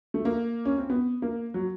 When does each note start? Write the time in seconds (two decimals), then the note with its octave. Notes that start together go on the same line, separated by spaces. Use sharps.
0.14 A3
0.25 A#3
0.65 C#4
0.78 C4
0.90 B3
1.22 A#3
1.54 F#3